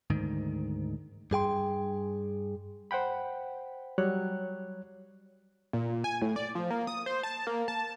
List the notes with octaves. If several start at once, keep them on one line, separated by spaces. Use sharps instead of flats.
D2 G#2 D#3
G2 G#4 G5 C6
C5 F#5 G5 B5
F#3 G3 C#5 F#6
A#2
G#5
A2
D5
F3
A#3
D#6
C5
A5
A#3
A5